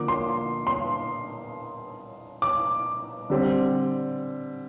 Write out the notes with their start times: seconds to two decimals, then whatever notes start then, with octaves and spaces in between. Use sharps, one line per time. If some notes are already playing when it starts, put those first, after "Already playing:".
Already playing: D3 F3 A#3 D6
0.08 C6
0.67 C6
2.42 D6
3.30 D3 G3 C4